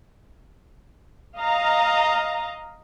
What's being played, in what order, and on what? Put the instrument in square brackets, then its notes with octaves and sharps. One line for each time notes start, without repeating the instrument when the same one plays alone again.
[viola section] D#5 F5 A#5